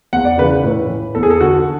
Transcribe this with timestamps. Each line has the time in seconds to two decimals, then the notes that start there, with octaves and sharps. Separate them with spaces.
0.13 E2 F#5
0.25 D5
0.38 C#3 E3 B4
0.51 B4
0.64 A2
0.89 E3
1.15 E2 A4
1.23 G#4
1.30 A4
1.40 D3 F#4